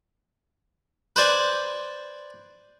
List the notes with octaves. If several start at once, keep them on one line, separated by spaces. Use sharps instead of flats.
B4 C5 D5 G#5